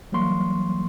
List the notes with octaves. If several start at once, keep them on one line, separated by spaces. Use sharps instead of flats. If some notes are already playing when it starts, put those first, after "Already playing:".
E3 F#3 G3 A#3 C6 C#6